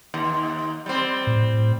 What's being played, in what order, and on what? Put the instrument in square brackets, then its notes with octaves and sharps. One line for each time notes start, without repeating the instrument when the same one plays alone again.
[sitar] D#2
G3 C4
[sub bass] A2